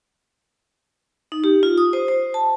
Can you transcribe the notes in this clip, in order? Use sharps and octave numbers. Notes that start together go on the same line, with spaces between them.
D#4
G4
F4
D#6
C5
C5
A5